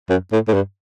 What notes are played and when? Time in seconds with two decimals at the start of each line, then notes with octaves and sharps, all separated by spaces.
0.10 F#2
0.32 A2
0.48 A2
0.54 G2